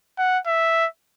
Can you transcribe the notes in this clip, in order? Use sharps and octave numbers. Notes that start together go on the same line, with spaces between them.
F#5
E5